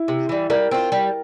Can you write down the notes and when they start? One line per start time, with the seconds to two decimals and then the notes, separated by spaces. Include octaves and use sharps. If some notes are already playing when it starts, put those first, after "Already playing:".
Already playing: E4
0.08 C3
0.29 E3 G3
0.50 G3 A#4
0.71 C4 F4
0.92 G3